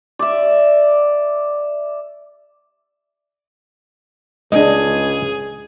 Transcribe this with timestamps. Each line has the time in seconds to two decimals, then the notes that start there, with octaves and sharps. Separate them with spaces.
0.19 D5 E5
4.52 C#2 G#3 D4 G#4 D#5